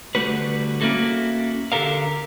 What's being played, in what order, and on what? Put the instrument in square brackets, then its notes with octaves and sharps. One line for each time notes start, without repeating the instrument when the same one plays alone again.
[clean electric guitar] D3 G3 A3 F#4 B4
A#3 C#4 E4 F#4 A4
D3 G4 A4 A#4 F5